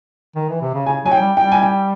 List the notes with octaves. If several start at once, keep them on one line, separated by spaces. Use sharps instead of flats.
D#3
E3
C3
C#3
C#3 G#5
F#3 G#5
G5
G3
G3 G5
G#5
G5